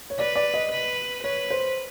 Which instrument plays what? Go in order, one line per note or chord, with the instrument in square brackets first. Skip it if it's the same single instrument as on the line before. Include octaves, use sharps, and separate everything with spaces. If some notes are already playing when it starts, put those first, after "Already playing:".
[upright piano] C#5
[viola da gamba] B4 [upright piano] D5
[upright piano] D5
D#5
[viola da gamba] B4
[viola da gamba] B4 [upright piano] C#5
[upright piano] C5